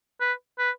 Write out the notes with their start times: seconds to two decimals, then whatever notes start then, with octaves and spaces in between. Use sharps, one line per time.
0.21 B4
0.59 B4